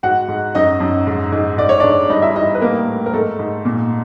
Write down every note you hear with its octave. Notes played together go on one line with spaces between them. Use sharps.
G#2 F#4 F#5
G#2
F#2 D#4 D#5
F#2
G#2
G#2
G#2 D5
C#5
G#2 D4 D5
G2 D#4 D#5
E4 E5
G2 D#4 D#5
B4
A2 A#3 A#4
A2
A#4
G#2 A3 A4
G#2
A#2